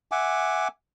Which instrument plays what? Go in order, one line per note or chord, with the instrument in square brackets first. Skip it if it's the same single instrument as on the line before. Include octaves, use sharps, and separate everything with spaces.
[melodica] E5 F#5 G#5 D6